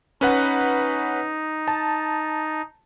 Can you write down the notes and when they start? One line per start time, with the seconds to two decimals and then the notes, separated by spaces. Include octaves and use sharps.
0.21 C#4 D#4 B4 F#5
1.68 A5